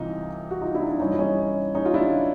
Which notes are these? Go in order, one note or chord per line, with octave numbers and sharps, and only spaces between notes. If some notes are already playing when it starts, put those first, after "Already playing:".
Already playing: C2 C3 E3 D#4 F4
F#4
D#4 F4
D4 E4
D#4
D4
G2 E3 G3 C#4 D#4
E4
C#4 D#4
C#4 D#4
F4
D4 E4